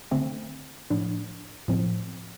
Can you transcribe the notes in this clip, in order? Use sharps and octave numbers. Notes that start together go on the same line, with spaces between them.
D3 A3 C4
A2 F3 D4
A2 F3 C4